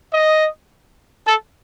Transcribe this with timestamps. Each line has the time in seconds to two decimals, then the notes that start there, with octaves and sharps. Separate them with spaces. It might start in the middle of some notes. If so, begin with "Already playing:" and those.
0.12 D#5
1.26 A4